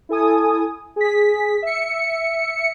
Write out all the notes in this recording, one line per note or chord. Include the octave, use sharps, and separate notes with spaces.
E4 A4 G#5 D#6
G#4 B6
E5 C#7